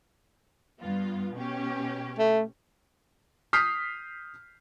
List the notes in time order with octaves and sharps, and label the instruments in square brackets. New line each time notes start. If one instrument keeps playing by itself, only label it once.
[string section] G2 B3 F4
B2 C#4 G4
[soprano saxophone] A3
[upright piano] D#6 F6 G6 B6 C7